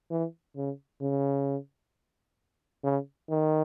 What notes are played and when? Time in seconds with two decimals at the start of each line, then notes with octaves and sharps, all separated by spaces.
0.11 E3
0.56 C#3
1.02 C#3
2.84 C#3
3.30 D#3